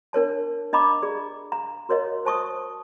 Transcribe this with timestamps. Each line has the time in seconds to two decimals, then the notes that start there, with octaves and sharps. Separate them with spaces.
0.13 D4 A#4 C#5 A5
0.73 D4 D#5 F5 A#5 B5 D6
1.02 G#4 D5
1.52 F5 A#5
1.89 F#4 A#4 C#5 D#5 F5
2.25 C5 A5 C#6 D#6